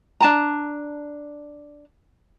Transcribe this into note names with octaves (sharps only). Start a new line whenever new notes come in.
D4 A5 A#5